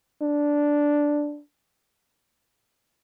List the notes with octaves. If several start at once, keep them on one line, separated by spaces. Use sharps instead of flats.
D4